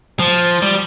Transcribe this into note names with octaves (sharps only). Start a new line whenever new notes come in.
F3
G3